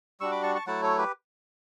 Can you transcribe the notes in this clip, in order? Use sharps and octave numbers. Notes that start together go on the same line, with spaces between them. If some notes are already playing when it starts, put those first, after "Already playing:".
G3 D4 F#4 C#6 E6
B5 D6
A5 C#6
A5 C#6
F#3 A3 E4 F#5 A5
A4 C#5
G4 B4